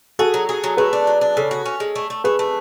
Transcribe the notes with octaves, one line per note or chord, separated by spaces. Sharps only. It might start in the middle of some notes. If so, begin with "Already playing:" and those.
F#4 G#4 A4
F#3
G#4
F#3
A3 G#4 B4
D4
F#3
D4
C#3 A4 C#5
F#4
C#4
G#3
A3
A3
A3 G#4 B4
A3